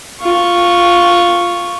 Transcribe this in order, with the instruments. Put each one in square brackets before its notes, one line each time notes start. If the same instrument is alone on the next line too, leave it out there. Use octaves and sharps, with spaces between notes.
[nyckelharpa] F4 C#6